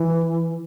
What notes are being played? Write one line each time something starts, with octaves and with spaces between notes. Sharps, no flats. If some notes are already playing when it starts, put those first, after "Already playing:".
Already playing: E3